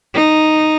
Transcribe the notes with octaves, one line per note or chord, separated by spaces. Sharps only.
D#4